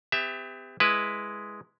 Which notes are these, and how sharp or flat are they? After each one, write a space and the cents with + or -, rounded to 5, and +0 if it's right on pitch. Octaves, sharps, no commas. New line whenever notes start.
B3 +45 G4 +30 E5 +0
G#3 +0 E4 +0 B4 +0